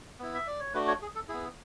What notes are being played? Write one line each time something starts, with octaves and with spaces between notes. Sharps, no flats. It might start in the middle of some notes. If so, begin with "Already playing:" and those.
B3 E4
E5
D5
C#5
A3 D4 F#4 B4
C#5
G#4
A4
B3 E4 G#4